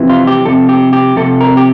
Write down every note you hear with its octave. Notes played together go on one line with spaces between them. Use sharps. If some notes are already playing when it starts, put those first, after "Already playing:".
Already playing: F2 C3 E3
F4
G4
F2 C3 A4
G4
G4
F2 C3 A4
A#4
G4